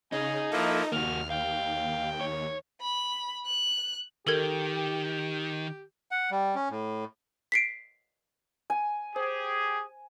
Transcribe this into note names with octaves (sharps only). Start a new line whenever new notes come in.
C#3 D#4 G#4
F3 A#3 E4 A4 D#5
D#2 A#3 F#4 F6
F5 G5
C#5
B5
F#6
D#3 G4 A4 A#4 G#6
F#5
G3
C#4
A2
B6 C7 D7
G#5
G4 G#4 C5